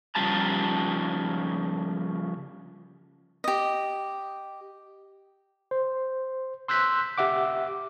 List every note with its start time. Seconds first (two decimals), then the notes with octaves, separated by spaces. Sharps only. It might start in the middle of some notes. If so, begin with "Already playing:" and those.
0.15 C#3 F3 G3 A5 A#5
3.44 G4 D#5
5.71 C5
6.68 C6 E6 F#6 G6 B6
7.18 G4 E5 F#5 D6